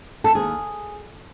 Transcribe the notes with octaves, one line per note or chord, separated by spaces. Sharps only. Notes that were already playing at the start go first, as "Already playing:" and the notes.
A4
D#2 G#4